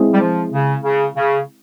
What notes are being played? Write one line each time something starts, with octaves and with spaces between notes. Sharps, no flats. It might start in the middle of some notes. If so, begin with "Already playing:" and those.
Already playing: G#3 C4 E4 G#4
G3
F3
C#3
C#3
C#3